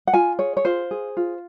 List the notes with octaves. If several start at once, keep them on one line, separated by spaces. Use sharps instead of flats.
F#5
F4 G#5
G#4 C#5
C#5
F4 C5
G#4
F4